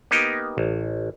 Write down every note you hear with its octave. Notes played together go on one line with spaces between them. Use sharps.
A#3 B3 D#4 G4 G5
A1